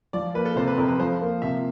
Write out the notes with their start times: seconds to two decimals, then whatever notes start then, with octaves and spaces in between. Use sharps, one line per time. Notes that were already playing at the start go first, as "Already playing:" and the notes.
0.13 F3 D5
0.34 A#3 B4
0.45 A4
0.56 C3 C5
0.68 B4
0.77 F2 A#4
0.88 B4
1.00 F3 C5
1.21 A#3
1.42 C3 E5